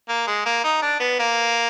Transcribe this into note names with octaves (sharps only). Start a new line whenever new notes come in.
A#3
G#3
A#3
D#4
D4
B3
A#3